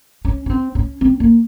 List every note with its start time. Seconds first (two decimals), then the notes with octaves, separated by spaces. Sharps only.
0.25 C#4
0.46 C#4
0.50 C4
0.75 C#4
1.01 C4
1.20 A#3